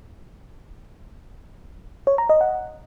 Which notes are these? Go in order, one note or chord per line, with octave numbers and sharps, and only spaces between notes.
C#5
A#5
D#5
F#5